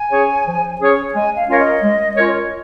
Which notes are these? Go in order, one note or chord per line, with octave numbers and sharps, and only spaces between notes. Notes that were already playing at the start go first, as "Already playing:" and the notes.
Already playing: G#5
C#4 G#4 C#5
F3
C#4 G#4 C#5
G#3 G#5
F5
C#4 F4 A#4 C#5 F5
D#5
G#3
C#4 F4 A#4 C#5